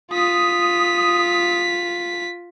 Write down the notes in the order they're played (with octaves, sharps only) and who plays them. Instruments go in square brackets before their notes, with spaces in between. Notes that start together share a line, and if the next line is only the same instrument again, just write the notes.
[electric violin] F4 B6 [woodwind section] D#6